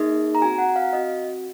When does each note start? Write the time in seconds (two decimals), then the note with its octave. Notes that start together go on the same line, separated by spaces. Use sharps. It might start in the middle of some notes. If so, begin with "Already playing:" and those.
Already playing: A#3 D#4 G#4
0.35 A#5
0.42 C4 F#4 G#5
0.58 F#5
0.76 F5
0.93 C4 F#4 D#5